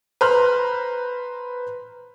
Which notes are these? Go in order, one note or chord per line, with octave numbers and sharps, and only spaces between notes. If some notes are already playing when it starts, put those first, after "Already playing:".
B4 C5 A#5 C6 F6 F#6